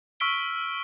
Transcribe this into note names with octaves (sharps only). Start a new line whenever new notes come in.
C#6 E6 F6 B6 D7 G7